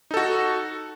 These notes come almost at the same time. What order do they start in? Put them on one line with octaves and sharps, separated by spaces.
D#4 A4 F#4